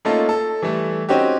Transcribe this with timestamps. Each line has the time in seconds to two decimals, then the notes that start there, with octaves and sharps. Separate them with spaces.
0.05 A3 A#3 C#4 D#4 F4 A4
0.29 A4
0.62 E3 G3 A3
1.09 C4 C#4 D#4 F#4 G4